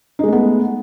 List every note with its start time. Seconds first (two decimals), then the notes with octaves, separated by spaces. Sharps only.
0.19 D#4
0.23 G#3
0.28 A3
0.32 B3